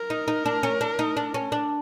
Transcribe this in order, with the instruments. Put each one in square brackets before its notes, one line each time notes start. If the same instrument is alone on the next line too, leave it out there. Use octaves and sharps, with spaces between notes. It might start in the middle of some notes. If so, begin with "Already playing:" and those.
Already playing: [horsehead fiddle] A#4
[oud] D#4
D#4
D4
C#4
D4
D#4
D4
C#4
D4